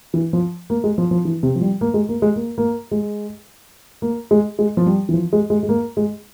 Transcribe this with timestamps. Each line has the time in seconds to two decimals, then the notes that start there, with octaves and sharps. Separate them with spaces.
0.14 E3
0.33 F3
0.70 A#3
0.84 G#3
0.98 F3
1.11 F3
1.25 E3
1.43 C3
1.56 F3
1.61 G3
1.81 A#3
1.94 G#3
2.09 A#3
2.22 G#3
2.36 A#3
2.58 A#3
2.91 G#3
4.02 A#3
4.31 G#3
4.59 G#3
4.77 F3
4.86 G3
5.09 E3
5.14 F3
5.33 G#3
5.50 G#3
5.63 G#3
5.69 A#3
5.97 G#3